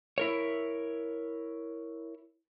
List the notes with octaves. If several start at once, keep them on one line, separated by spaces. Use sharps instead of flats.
E4 A#4 C#5